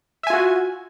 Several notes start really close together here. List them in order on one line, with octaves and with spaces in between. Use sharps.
E5 G#5 F4 F#4